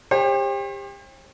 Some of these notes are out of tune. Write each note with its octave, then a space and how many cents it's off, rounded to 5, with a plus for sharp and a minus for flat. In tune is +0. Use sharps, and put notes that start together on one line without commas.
G4 +30 C5 +45